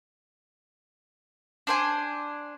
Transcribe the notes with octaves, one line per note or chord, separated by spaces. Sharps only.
D4 C5 G#5